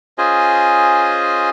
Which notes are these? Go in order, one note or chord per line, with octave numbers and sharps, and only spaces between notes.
C#4 F4 G#4 C5 D#5 G#5